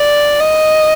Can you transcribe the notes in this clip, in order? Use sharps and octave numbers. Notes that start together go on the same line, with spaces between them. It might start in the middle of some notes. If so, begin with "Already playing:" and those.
Already playing: D5
D#5